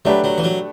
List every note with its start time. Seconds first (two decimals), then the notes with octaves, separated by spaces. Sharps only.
0.05 F#3 A3 D4 G4 B4
0.24 F#3
0.38 E3
0.44 F#3